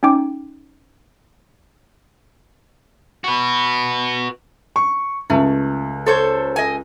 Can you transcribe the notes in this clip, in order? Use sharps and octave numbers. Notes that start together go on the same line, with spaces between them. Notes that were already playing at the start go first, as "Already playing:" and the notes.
C#4 D#4 G5 D6
F#4 B4
C#6
C#2 A3
A4 C5 C#5
D#5 G#5